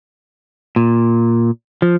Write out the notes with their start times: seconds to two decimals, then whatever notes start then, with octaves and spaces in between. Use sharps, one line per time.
0.76 A#2
1.82 F3